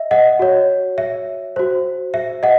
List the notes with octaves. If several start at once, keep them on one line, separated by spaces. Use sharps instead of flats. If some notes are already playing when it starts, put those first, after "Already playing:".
Already playing: D#5 E5
D#5 F#5
F#4 C#5
E5
F#4 C5
E5
D#5 F#5